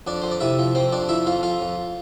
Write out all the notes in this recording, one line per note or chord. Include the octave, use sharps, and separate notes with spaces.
F2 D4 D5
F2 C5
D5
C3 E4 E5
F3
F2 C4 C5
F2 D4 D5
F3 E4 E5
F2 F4 F5
F2 F4 F5
F2